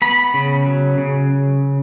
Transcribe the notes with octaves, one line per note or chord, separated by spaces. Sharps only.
B3 B5
C#3
F#3
C#3